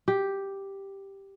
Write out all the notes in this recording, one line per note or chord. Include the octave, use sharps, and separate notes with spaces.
G4